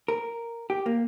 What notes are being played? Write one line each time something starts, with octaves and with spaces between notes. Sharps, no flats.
A#4
G4
A#3